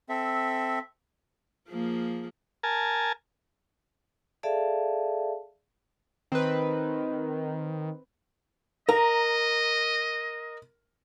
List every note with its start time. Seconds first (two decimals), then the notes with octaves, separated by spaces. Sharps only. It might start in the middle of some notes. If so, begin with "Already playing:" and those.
0.09 C4 A4 E5
1.69 F3 A#3 G#4
2.63 A#4 G#5 A5
4.43 G#4 A4 D5 E5 F5 A5
6.32 D#3 C4 B4
8.89 A#4 D#5 A#5